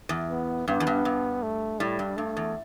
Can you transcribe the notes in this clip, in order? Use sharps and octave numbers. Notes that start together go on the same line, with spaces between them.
E2
B3
G2 B3
E2
G2
G2
A3
A2 G3
G2
G2 A3
E2